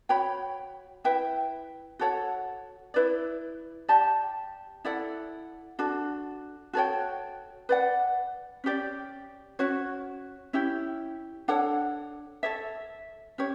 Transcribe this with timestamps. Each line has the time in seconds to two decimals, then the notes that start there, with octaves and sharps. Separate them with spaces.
0.09 F#4 C#5 G5 B5
1.04 E4 B4 E5 G5
1.99 F#4 A4 C#5 F#5
2.94 E4 B4 D5
3.88 G4 D5 A5
4.85 E4 A4 D5 F#5
5.79 D4 F#4 A4
6.73 F#4 A4 C#5 G5
7.69 B4 D5 F#5
8.64 C#4 G4 D5
9.59 C#4 F#4 C#5
10.53 C#4 E4 G4
11.48 D4 A4 C#5 F#5
12.43 A4 C#5 E5
13.38 C#4 G4 C#5